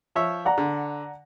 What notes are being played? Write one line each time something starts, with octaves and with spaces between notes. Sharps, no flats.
F3 C#5 E5
D5 F#5 A#5
D3